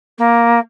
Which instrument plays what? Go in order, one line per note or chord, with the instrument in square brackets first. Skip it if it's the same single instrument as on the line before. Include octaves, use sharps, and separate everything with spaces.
[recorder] A#3